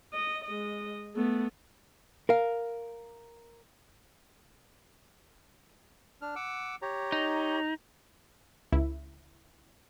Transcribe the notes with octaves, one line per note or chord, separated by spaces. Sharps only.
D#5
G#3 D#5
A3 B3
A#4 F5
D4 F6
F#5 D6 E6
G4 C#5 A#5
D#4
C#2 E4